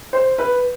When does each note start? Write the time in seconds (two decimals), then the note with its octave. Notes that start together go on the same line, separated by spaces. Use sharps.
0.13 C5
0.38 B4